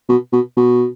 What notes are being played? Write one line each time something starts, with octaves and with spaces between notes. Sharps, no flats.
B2
B2
B2